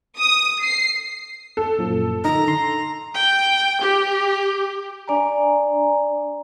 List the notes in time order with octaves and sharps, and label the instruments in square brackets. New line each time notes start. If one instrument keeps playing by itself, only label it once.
[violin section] D#6
C7
[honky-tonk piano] A4
[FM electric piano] F#2 A#2 F3
[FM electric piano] D3 D#3 D#4 [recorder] A#5
[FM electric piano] C6
[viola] G5
G4
[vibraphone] D4 D5 G#5 A#5